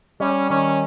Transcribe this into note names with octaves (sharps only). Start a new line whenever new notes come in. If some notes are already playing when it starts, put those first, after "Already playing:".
G3 C#4
D#3 C#4